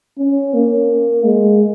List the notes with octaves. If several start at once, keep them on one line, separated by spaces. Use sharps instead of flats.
C#4
A#3
G#3